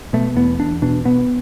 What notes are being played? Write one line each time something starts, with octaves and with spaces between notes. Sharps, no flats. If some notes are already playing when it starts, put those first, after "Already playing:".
B2 A3
E2 B3
E2 D4
B2 D4
B2 B3